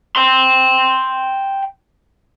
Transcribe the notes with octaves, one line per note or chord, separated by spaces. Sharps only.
G5 C6